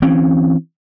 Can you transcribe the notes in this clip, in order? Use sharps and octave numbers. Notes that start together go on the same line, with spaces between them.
E3 C4 C#4